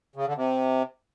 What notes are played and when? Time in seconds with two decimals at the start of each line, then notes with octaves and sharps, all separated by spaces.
0.16 C#3
0.26 D3
0.36 C3